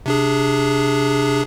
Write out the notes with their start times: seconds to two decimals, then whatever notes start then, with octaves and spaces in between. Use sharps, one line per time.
0.06 C3 D4 G#4